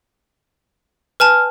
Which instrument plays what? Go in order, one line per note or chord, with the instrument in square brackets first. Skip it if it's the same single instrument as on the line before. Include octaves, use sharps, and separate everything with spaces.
[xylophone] B4 G#5 A5 [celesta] F6